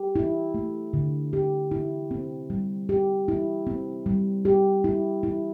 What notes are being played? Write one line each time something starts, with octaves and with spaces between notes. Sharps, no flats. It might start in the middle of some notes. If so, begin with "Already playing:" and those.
Already playing: G4
E4
A3
D3
G4
E4
C4
G3
G4
E4
C4
G3
G4
E4
E4